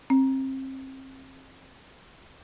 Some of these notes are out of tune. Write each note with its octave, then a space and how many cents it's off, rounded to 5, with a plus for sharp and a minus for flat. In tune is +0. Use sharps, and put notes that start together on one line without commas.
C4 +30